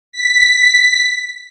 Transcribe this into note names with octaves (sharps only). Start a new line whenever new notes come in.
B6